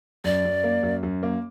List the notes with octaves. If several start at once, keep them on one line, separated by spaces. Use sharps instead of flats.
F#2 D5
F#2
A#3
F#2
F#2
A#3